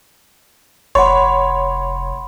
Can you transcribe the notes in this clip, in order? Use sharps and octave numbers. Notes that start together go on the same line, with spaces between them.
F1 C#5 F#5 B5 C6